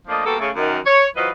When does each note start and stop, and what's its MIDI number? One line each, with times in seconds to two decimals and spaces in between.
0.08 0.23 53
0.08 0.23 57
0.08 0.23 58
0.08 0.23 62
0.08 0.23 70
0.08 0.23 75
0.25 0.35 55
0.25 0.35 58
0.25 0.35 59
0.25 0.35 66
0.25 0.35 69
0.39 0.50 49
0.39 0.50 57
0.55 0.78 42
0.55 0.78 51
0.85 1.07 73
1.15 1.29 52
1.15 1.29 54
1.15 1.29 65
1.15 1.29 71
1.15 1.29 72
1.15 1.29 75